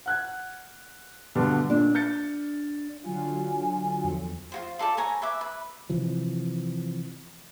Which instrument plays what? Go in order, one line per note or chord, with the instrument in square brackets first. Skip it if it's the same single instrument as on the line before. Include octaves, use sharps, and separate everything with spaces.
[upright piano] F#5 F#6 G#6
G2 B2 D3
[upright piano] A#2 [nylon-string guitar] D4
[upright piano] G6 A6 C#7
[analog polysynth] D3 F#3 F4 [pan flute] G#5
[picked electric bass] E2 F3 [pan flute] A4
[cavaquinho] F4 F#4 C5
F4 A4 D5 A5
B4 C#5 G#5 A#5
B4 E5 D6
B4
[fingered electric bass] C3 E3 F3